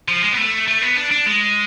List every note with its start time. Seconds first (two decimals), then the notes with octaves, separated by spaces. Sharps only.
0.08 F3
0.22 G#3
0.33 B3
0.37 A3
0.67 A3
0.82 B3
0.96 D4
1.11 D4
1.26 G#3